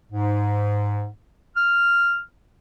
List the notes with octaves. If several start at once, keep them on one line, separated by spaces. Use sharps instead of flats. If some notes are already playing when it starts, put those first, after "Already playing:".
G#2
F6